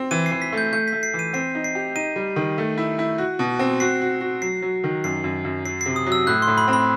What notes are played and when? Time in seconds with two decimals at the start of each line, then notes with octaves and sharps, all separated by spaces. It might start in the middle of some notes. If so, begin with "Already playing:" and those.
Already playing: C4
0.11 E3 D#7
0.26 C7
0.31 E3
0.42 B6
0.52 A3
0.58 G6
0.73 A3 G6
0.88 A3 B6
1.03 C7
1.14 E3
1.19 D#7
1.33 C4 C7
1.55 D#4
1.64 C7
1.75 G4
1.95 D#4 D#7
2.16 G3
2.36 D#3
2.58 A3
2.78 E4
2.99 E4
3.18 F#4
3.39 B2
3.59 C4
3.80 F#4 C7
4.02 F#4
4.21 F#4
4.42 F#3 C7
4.62 F#3
4.84 D#3
5.04 F#2 C7
5.24 F#2
5.45 F#2
5.65 F#3 C7
5.81 C3 C7
5.96 D#6
6.06 F#3
6.12 E6
6.27 A2 F#6
6.42 C6
6.47 A2
6.58 B5
6.68 C4
6.73 B5